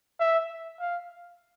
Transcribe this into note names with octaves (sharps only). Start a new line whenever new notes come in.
E5
F5